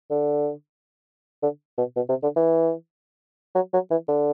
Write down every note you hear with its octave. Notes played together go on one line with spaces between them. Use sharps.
D3
D3
B2
B2
C3
D3
E3
F#3
F#3
E3
D3